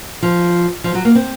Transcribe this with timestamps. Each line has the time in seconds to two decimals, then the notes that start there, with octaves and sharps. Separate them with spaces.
0.22 F3
0.84 F3
0.95 F#3
1.05 A#3
1.15 C4